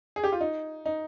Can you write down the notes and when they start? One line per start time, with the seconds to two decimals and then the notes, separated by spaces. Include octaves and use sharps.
0.16 G#4
0.24 G4
0.32 F4
0.41 D#4
0.86 D#4